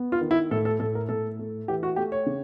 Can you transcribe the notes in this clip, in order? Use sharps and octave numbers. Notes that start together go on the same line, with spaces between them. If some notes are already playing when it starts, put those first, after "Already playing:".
Already playing: B3
F4
D#3
E4
A2 A4
A4
A2 A4
A#4
A2 A4
A3
E3 G4
F#4
A3 G4
C#5
C#3